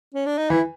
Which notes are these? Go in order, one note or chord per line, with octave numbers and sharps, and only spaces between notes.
C#4
D4
D#4
E3 E4